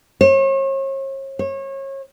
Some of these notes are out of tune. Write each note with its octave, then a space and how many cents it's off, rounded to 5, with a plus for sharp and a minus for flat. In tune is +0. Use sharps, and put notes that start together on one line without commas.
C#5 -40
C#5 -30